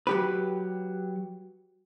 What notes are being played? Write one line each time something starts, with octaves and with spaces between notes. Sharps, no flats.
F#3 G4 B4